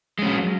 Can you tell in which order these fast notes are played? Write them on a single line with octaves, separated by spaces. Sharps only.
G#3 C#4 F#3